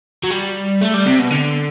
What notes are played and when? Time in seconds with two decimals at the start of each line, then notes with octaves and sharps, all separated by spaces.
0.23 F#3
0.30 G3
0.81 A3
0.94 G3
1.06 C3
1.19 B2
1.30 D3